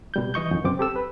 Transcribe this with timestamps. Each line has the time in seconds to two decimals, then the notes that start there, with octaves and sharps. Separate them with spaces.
0.14 B2 G3 G6
0.34 E3 D#5 C#6 G6
0.51 F2 D#3
0.64 C2 F#2 C4 D6
0.78 C4 G4 A4 E6
0.96 B4